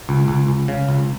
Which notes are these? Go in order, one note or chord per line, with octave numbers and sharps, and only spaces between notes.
C#2
C#2
C#2
C#3
C#2